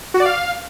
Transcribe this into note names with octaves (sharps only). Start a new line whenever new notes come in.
F#4
D5
F5